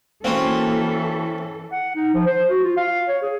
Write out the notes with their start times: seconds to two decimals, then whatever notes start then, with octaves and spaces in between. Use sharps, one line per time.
0.24 E3 A#3 C4 C#4 F4 F#4 A4 F5
1.72 F#5
1.96 D#4
2.14 F3
2.27 C5
2.50 F#4
2.64 F4
2.77 F5
3.08 C#5
3.22 G#4